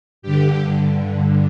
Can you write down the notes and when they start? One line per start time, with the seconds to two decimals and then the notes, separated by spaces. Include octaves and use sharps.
0.22 G2 D3 G4